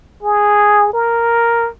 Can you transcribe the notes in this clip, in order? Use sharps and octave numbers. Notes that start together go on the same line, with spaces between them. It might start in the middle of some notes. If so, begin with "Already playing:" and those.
G#4
A#4